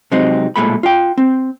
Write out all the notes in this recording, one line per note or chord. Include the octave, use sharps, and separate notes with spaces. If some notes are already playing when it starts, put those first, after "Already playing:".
C3 F#3 G#3 C4 D#4
B1 A#2 C#3 G#3 A3 B5
F4 G5
C4